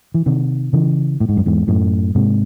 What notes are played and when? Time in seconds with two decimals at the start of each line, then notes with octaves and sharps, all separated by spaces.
0.14 E3
0.26 C3 D#3
0.73 C#3 E3
1.20 A2
1.29 G#2
1.37 F#2
1.46 E2 G#2
1.68 F#2 A2
2.15 G#2 C3